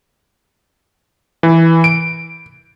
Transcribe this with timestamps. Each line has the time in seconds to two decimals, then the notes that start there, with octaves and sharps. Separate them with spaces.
1.43 E3
1.84 D7